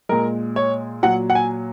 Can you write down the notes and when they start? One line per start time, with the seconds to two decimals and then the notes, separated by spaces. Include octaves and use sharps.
0.09 A#2 G#3 A#4
0.56 C#5
1.03 A#2 F#3 F#5
1.30 F#5
1.35 G#5